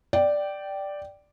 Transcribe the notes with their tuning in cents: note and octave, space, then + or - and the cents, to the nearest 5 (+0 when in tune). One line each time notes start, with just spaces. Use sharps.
D5 +0 G5 -15